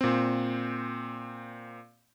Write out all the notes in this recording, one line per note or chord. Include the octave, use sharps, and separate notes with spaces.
A#2 C4